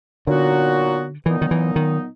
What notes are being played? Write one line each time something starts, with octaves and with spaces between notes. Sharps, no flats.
A#2 D3 F#3 B3 D#4 F#4
A#2 E3 F#3 B3 D#4
D#3
E3
D#3